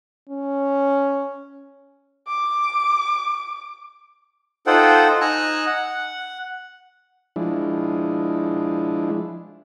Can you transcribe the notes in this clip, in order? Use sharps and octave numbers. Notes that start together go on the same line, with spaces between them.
C#4
D6
D#4 F4 A4 C5 F#5 G5
D#4 G#5 A#5 E6 F#6
F#5
F3 G#3 D4 E4